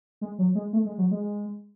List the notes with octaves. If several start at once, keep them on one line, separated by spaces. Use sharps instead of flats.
G#3
F#3
G#3
A3
G#3
F#3
G#3